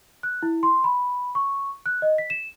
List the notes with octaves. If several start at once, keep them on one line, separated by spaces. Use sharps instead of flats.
F#6
E4
C6
B5
C#6
F#6
D#5
B6
E7